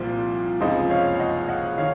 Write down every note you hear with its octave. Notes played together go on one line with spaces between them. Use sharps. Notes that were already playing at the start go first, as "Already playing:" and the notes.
Already playing: C2 A#2 F3 C4
C#2 C3 F3 C4 D#4 C5 D#5
C#5 F5
D#5 F#5
D#5 F#5
D#3 C#5 F5